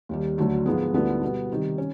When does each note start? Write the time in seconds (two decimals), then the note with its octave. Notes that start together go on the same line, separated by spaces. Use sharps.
0.09 D#2 D#3 G3
0.38 D2 D3 F#3 A3
0.66 G#2 F3 G#3 B3
0.94 D2 D3 G3 B3 E4
1.22 B2 G3 B3
1.50 C3 D#3 G3
1.78 C#4